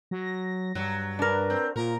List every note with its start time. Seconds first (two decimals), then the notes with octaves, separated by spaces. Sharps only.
0.11 F#3 A#6
0.75 G2 F#3
1.19 D4 A#4 B4
1.50 C4
1.76 A#2 F4 A#4